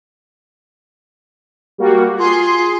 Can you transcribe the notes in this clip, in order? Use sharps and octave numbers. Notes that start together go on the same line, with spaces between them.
G3 A#3 F#4
F4 G#4 C6